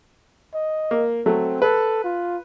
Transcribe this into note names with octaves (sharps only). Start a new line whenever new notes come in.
D#5
A#3
F#3 A3 C4
A4 B4
F4